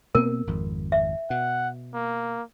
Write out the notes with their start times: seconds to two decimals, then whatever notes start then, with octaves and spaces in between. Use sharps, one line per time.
0.15 B2 A#3 C4 A#4
0.47 G#1 F2
0.92 E5
1.30 B2 F#5
1.94 A#3